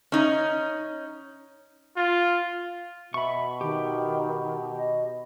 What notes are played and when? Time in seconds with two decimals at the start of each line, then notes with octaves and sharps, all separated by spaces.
0.12 C#4 D#4
1.97 F4
3.14 B2 E5 B5 C#6
3.61 D#3 G4
4.76 D#5